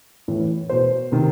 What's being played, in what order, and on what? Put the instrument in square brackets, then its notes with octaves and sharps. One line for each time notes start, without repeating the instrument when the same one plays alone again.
[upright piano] A2 E3
B2 C5
C3 D#3